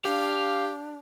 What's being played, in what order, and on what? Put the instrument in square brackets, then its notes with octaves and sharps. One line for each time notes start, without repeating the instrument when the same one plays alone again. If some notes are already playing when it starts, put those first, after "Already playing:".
[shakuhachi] D4 [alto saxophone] G4 [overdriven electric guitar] F5